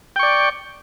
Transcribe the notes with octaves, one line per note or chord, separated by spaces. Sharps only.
D5 G5 C#6